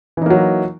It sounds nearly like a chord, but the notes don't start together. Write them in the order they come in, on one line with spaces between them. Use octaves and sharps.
E3 D#4 A#3 F#3